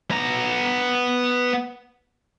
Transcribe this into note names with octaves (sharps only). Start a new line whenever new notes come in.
B3 A#5